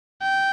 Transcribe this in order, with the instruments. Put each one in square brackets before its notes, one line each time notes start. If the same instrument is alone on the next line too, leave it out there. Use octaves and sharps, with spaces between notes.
[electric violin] G5